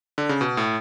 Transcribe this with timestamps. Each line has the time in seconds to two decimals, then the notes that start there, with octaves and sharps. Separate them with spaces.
0.18 D3
0.29 C#3
0.41 B2
0.57 A2